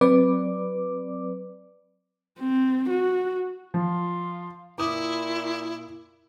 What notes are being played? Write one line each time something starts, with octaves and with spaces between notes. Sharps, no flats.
F#3 C4 B4 D5 D6
C4
F#4
F3 F4
A#2 E4 D6 D#6